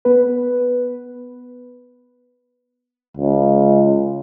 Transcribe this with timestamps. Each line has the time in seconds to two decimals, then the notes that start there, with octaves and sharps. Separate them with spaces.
0.05 B3 B4
3.17 C#2